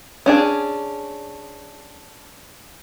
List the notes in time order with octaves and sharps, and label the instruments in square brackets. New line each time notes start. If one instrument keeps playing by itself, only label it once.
[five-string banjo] C#4 D4 G#4